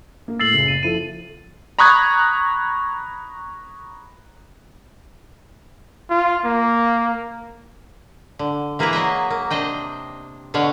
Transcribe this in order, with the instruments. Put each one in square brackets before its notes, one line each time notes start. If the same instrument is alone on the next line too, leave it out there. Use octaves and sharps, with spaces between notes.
[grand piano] A#3
[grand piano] A2 E6 [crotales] A6 C7 F#7
[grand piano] F#1 C#3
[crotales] D#7
[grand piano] F3 E4 A4 [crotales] D#7
[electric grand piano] A#5 B5 C#6 D#6 F#6 G#6
[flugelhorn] F4
A#3
[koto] D3
E3 A#3 E4 G#4 B4 A#5
F#3 A#4 D#5 E5
A#3
C3 D4 C5 D#5 G5
B2 D3 C#5 F5 F#5